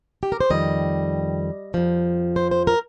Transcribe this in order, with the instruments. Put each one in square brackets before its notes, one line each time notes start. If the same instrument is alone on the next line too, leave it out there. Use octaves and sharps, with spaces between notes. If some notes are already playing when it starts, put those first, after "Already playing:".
[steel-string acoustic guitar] G4
A#4
C5
F2 D#3 G3 D#5
F2 F3
C5
C5
A#4